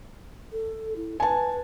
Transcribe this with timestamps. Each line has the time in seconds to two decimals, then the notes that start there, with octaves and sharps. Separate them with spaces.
0.52 A4
0.96 E4
1.20 B4 G#5 A5